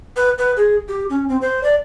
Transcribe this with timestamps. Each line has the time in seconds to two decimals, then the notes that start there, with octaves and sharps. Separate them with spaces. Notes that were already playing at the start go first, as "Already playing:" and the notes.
0.16 B4
0.38 B4
0.57 G#4
0.88 G4
1.10 C#4
1.29 C4
1.41 C5
1.63 D5